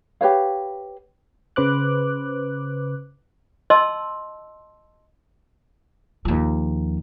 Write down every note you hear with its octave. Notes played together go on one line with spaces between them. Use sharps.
G4 B4 C#5 F5
C#3 B4 C5 D6 F#6
D#5 A5 C6 E6
D#2 F3